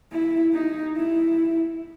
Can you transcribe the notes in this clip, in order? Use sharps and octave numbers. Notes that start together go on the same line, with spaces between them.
E4
D#4
E4